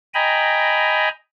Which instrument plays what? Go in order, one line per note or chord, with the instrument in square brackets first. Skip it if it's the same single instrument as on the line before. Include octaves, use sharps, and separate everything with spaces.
[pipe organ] D#5 G5 G#5 A#5 B5